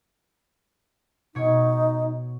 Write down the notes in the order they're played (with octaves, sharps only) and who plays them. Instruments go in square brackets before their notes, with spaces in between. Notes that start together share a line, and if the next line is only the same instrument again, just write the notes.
[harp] B2 C#5 [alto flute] D#4